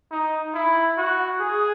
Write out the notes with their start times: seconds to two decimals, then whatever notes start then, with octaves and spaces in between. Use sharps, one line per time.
0.11 D#4
0.54 E4
0.97 F#4
1.41 G#4